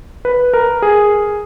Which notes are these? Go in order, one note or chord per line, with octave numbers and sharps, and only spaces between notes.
B4
A#4
G#4